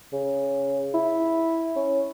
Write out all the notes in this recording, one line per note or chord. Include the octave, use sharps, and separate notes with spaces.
C#3
E4
C#4